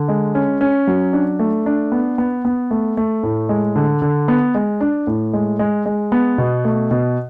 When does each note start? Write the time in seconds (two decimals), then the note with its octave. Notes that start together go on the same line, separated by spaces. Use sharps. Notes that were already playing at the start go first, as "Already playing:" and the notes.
Already playing: D3
0.08 G#3
0.35 C#4
0.61 C#4
0.87 F#3
1.13 D4
1.39 A3
1.66 D4
1.92 B3
2.18 B3
2.45 B3
2.71 A3
2.97 A3
3.23 A2
3.49 G#3
3.76 D3
4.02 D3
4.28 B3
4.55 G#3
4.81 D4
5.07 A2
5.33 G#3
5.59 G#3
5.86 G#3
6.12 B3
6.38 B2
6.65 A3
6.91 B2